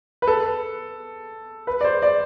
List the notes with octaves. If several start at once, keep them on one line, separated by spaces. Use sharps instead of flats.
B4
A4
B4
D5
C5
D5